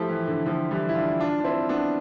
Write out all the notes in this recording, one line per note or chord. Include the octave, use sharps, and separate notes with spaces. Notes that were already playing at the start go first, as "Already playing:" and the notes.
Already playing: F3 A3 E4 G4
E3
D3
D3 F3
E3 G3
E4
D4 F4
D4 F4
D4
C4 E4
B3 D4